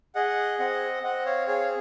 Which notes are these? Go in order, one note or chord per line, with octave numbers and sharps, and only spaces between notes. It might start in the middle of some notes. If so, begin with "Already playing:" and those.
G#4 D#5 F#5
C4 D#5 F#5
C4 D#5 F#5
C#5 F5
G#4 C#5 F5